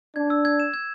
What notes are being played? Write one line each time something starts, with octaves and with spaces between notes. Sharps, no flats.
D4 G#6
E6
G#6
E7
G#6